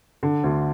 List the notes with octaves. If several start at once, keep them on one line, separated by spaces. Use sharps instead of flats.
D3
D2